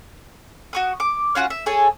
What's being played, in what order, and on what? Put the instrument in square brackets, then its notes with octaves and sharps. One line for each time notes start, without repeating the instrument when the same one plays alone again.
[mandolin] F#4 C#6 D#6
D6
C#4 F4 F#4 F#5
E5
G#4 A4 C#5 G#5